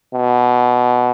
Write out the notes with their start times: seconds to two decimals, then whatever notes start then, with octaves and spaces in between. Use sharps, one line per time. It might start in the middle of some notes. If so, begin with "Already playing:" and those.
0.14 B2